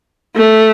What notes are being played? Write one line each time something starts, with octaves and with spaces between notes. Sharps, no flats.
A3